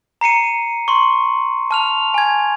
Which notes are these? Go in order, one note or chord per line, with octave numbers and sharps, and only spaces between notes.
A#5 C7 C#7 D#7
C6 C#6
A5 F6 F7
G#5 G#6